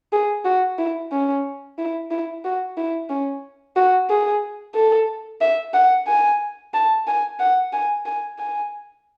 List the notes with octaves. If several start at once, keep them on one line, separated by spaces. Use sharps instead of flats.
G#4
F#4
E4
C#4
E4
E4
F#4
E4
C#4
F#4
G#4
A4
E5
F#5
G#5
A5
G#5
F#5
G#5
G#5
G#5